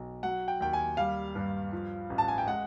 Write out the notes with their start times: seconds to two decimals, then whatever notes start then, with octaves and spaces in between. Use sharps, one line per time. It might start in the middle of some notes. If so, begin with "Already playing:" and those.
Already playing: B1
0.23 F#3 F#5
0.48 G5
0.60 D#2 G5
0.73 G#5
0.97 G3 F5
1.35 G2
1.72 F3
2.10 A1
2.18 A5
2.28 G#5
2.38 G5
2.47 G#3 F#5